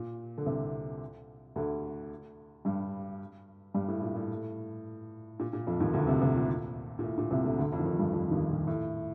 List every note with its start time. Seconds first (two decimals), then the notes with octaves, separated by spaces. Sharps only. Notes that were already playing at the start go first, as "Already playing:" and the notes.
Already playing: A#2
0.38 D3
0.46 C2 C3
1.56 D2 D3
2.65 G2 G3
3.74 G2 G3
3.88 A2
4.02 A#2
4.16 A2
5.39 A#2
5.53 A#2
5.67 F2 F3
5.80 D#2 D#3
5.93 D2 D3
6.07 C2 C3
6.22 C2 C3
6.36 A#2
6.99 A#2
7.04 A2
7.18 A#2
7.31 C2 C3
7.44 D2 D3
7.58 D2 D3
7.72 F2 F3
7.79 D#3
7.86 F2 F3
7.99 G2 G3
8.13 F2 F3
8.31 D#2 D#3
8.49 A#2
8.67 A2